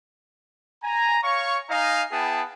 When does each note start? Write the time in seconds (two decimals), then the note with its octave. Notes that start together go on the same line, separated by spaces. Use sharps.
0.83 G#5 A#5
1.23 C#5 F5 C#6
1.70 D#4 D#5 F5 G#5 A#5
2.11 B3 E4 G#4 G5 A5